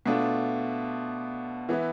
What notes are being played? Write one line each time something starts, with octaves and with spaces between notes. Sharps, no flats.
B2 A3 D4 F4
E3 B3 E4